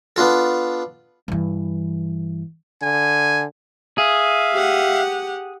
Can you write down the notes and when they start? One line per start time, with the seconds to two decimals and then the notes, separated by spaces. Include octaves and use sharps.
0.16 B3 D4 F4 A4
1.28 G2 E3
2.82 D3 G#5
3.98 G#4 E5 F5
4.53 G4 F#5